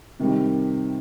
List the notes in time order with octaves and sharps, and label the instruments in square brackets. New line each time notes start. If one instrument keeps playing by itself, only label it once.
[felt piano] C3 D#3 G3